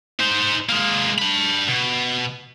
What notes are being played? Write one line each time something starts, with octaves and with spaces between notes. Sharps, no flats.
D#4 C5
G#3 A#3
D4 B5
B2